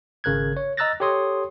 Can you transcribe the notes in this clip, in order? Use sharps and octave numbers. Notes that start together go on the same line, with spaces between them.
G#1 C#3 A#4 F#6 G#6
C#5
D#5 A#5 E6 F#6 A6 A#6
G4 A4 C#5 C6 D#6